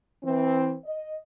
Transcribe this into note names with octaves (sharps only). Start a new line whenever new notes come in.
E3 C4
D#5